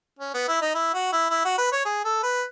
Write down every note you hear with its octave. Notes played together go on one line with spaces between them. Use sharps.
C#4
B3
E4
D#4
E4
F#4
E4
E4
F#4
B4
C#5
G#4
A4
B4